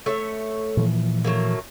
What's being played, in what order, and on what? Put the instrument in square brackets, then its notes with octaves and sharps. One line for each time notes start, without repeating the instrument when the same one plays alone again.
[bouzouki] A3 C#5 E5
[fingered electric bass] A#2 E3 F3
[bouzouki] F#3 A3 A#3